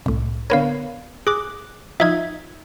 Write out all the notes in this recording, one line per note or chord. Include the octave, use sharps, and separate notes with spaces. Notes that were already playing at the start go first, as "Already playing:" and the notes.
C2 A2
D3 B3 A#4 C#5 F5
G#4 D6 F#6
F3 D#4 F4 E5 G#6